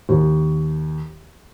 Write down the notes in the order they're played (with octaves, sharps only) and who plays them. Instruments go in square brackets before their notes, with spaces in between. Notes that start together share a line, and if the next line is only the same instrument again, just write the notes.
[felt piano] D#2